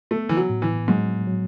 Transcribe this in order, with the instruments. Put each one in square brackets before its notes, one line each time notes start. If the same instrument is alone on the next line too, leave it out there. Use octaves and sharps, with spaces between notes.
[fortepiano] A3 [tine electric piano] B3
[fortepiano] E3
F#3
[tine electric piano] A2
[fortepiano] E3
[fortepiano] G#2 [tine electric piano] F#3
[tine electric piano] F#3